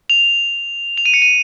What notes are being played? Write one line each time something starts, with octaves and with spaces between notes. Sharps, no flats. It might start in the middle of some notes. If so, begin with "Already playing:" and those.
F7
F7
D#7
C#7
D#7